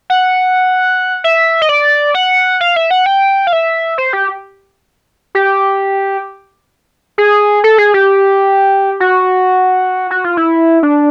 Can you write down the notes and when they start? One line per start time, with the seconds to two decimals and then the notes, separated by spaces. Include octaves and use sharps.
0.10 F#5
1.24 E5
1.62 D#5
1.69 D5
2.14 F#5
2.61 F5
2.76 E5
2.91 F#5
3.06 G5
3.47 F5
3.53 E5
3.98 C5
4.13 G4
5.35 G4
7.18 G#4
7.64 A4
7.78 G#4
7.94 G4
9.00 F#4
10.11 F#4
10.24 F4
10.37 E4
10.83 D4